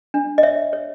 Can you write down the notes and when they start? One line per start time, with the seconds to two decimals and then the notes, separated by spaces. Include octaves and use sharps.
0.14 D4
0.38 D#5
0.43 C#5 E5
0.73 C#5